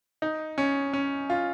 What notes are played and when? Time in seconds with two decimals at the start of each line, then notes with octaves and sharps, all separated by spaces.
0.22 D#4
0.58 C#4
0.93 C#4
1.30 F4